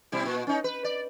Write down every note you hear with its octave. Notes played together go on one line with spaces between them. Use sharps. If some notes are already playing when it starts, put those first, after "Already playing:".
B2 G3 E4
A#2
C#4 D#4
B4
D5